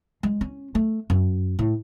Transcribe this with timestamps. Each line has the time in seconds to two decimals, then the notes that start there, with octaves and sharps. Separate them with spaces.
0.23 G#3
0.41 C#4
0.75 A3
1.10 F#2
1.59 A2